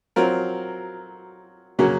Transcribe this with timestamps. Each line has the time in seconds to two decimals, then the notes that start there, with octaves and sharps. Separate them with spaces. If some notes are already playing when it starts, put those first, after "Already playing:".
0.16 F#3 C4 F4 A#4
1.79 C#3 F#3 A#3 C#4 F#4